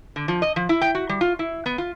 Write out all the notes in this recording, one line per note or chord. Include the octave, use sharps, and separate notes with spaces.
D3
F3
D#5
F3
E4
G5
F#4
G3
F4
E4
B3
F4